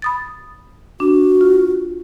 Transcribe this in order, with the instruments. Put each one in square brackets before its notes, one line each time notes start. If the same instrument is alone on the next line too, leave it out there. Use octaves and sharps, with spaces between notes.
[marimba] B5 D#6 A6
[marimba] D4 [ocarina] F#4
[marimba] F4